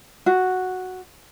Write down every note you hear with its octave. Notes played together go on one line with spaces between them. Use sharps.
F#4